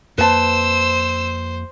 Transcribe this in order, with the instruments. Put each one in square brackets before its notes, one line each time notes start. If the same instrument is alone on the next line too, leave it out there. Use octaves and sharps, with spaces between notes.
[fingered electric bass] F2 A#3 [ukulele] B4 A5 [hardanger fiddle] C5 [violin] E6